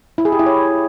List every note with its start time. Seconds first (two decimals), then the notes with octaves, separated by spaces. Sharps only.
0.18 E4
0.25 G#4
0.32 G4
0.39 E4
0.46 C#5